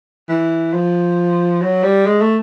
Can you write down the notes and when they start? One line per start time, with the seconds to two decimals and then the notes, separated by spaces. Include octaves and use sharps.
0.29 E3
0.73 F3
1.62 F#3
1.83 G3
2.06 G#3
2.21 A3